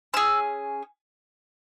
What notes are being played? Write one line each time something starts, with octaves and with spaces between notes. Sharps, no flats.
C#4 G#4 E6